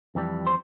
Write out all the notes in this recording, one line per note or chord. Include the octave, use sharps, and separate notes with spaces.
F2 E3 G3
C5